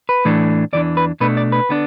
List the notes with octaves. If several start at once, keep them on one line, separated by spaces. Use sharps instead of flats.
B4
A2 E3 A3 D4
E2 E3 D4 D5
B4
B2 A3 D4 B4
D5
B4
D3 B3 D4